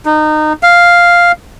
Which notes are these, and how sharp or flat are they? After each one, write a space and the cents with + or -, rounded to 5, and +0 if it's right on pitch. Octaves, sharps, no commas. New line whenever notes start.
D#4 -25
F5 +0